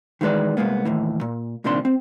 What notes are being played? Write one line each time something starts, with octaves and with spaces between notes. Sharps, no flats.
D#3 E3 G#3 B4 D5
C2 G#2 G#3 A#3 B3
D#2 A2 E3
A#2
C2 A#2 D#3 C4 D4 C6
C4